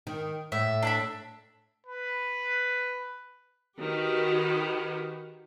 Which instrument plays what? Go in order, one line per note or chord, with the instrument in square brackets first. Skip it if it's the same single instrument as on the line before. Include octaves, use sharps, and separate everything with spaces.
[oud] D#3
[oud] A2 [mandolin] E5
[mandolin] D4 E5 B5
[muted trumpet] B4
[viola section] D#3 F#4 G4 B4